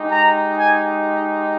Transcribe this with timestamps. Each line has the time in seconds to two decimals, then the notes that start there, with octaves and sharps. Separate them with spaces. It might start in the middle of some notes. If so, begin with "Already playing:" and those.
Already playing: G#3 D#4 G4
0.12 A#5
0.58 G#5